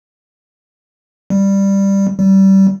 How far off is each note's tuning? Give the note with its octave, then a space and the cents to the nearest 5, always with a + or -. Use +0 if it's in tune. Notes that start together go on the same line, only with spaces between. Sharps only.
G3 +5
G3 -25